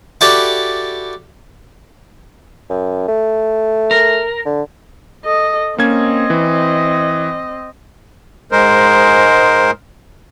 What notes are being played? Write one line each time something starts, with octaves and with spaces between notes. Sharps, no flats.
E4 F#4 G4 A4 B4 D5
F#2
A3
A#4
D3
A4 D#5
A#3 C4 C#4 D#5 G#6
E3
G#2 G#3 A#4 C5